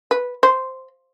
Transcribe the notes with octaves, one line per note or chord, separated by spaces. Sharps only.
B4
C5